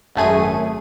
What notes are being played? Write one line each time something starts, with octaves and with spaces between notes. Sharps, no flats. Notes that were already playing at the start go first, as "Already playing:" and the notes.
G#1 F#2 A3 G#4 D#7